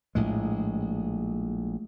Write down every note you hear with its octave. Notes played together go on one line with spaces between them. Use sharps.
A#1 A2 G#3